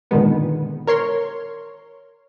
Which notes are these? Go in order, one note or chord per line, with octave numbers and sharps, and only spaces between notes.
A#2 D3 D#3 G#3 B3
A#4 C#5 C6